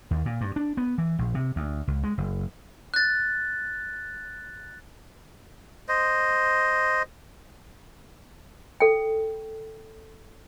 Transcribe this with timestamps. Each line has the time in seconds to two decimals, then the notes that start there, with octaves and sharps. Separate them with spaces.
0.11 D#2
0.26 A#2
0.41 G2
0.56 D4
0.77 B3
0.98 E3
1.19 A#1
1.35 C3
1.56 D2
1.88 C#2
2.03 G#3
2.18 F#1
2.94 F#6 A6
5.89 C5 D#5
8.80 A4 G5